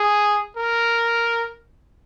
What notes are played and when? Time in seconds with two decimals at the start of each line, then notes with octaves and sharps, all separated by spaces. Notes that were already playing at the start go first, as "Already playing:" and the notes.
Already playing: G#4
0.57 A#4